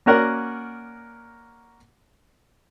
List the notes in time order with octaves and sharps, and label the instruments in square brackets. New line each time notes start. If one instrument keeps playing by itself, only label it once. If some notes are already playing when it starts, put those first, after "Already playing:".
[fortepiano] A#3 C#4 F#4 A#4 D5 F#5